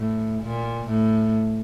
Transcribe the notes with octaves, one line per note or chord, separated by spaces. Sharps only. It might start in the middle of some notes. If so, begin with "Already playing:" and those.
Already playing: A2
A#2
A2